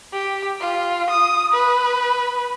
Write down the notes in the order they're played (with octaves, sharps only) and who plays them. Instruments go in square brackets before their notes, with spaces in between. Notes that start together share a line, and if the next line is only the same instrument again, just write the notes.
[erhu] G4
F4
D#6
B4